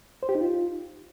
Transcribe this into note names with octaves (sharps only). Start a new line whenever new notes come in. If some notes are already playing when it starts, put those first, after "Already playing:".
C5
G4
D#4
F4